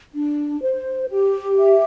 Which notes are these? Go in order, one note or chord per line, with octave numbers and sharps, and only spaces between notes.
D4
C5
G4
E5